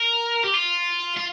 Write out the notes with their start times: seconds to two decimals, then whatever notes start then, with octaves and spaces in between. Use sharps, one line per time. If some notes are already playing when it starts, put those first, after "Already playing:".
Already playing: A#4
0.44 G4
0.54 F4
1.17 F4